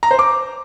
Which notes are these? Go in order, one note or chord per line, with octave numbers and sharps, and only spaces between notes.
A#5
C5
D6